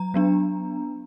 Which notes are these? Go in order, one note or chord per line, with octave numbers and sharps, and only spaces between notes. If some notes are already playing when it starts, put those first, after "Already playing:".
Already playing: F#3 A#5
F#3 B3 D4